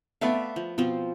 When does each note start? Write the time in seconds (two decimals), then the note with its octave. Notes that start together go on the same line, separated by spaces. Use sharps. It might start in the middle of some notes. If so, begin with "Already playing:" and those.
0.21 A3 B3 D5 E5 F5
0.56 F3
0.78 B2 F3 C4 F4